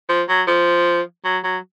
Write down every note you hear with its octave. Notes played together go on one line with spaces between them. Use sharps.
F3
F#3
F3
F#3
F#3